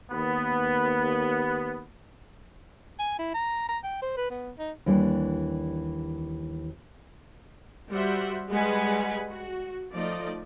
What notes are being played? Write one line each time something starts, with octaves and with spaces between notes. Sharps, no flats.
D#2 B3
G#5
E4
A#5
A#5
G5
C5
B4
B3
D#4
D#2 E3 G3 D4
G3 F#4 C5 E5 F#5
G3 G#3 B4 F#5 G#5 B5
F#4
F3 A3 D#4 D5 D#5